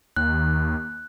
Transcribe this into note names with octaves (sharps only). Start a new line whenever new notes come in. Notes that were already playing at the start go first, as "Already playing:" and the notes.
D#2 F#6